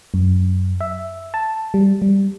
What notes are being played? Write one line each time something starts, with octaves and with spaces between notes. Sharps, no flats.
F#2
E5
A5
G3
G3